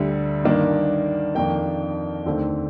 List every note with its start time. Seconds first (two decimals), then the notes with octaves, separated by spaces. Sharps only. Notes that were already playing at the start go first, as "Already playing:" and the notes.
Already playing: D2 D3 G3
0.44 G2 D#3 A#3 D4
1.35 F2 D#3 A#3 D4 G5
2.26 D#2 D3 A3 C4